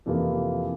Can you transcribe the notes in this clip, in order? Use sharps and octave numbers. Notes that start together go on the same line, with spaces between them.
F2 C3 E3 A#3 F4